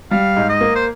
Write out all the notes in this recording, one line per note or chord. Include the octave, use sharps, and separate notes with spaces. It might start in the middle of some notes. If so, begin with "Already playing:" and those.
G3 F5
G#2
D#5
A#3
C5